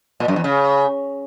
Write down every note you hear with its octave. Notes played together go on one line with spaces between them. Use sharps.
A#2
F#2
E2
C#3